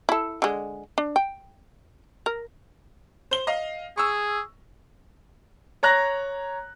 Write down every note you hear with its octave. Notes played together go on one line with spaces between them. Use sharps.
E4 A4
D3 G#3
D4
G5
A#4
C5 G7
D#5 F5
G#4 C#6 E6
C#5 A#5 F#6 A#6